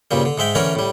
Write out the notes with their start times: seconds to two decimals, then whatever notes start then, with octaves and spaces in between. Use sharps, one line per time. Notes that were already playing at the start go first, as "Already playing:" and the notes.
0.11 G2 A#2 C#3 G3
0.25 D3
0.38 G#2 G#3 E5 G5
0.55 D3 E3 A3 C#4 A#4 C#5
0.75 A2 G3